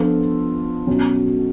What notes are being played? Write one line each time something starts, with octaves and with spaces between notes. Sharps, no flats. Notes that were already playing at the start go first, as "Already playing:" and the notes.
Already playing: F3 B3 D4 F4 A4
B2 F#3 C#4